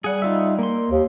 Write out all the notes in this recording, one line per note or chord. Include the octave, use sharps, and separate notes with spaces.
G3 G#4 F#5
D#4 F4 E5
A#3 C6
D#2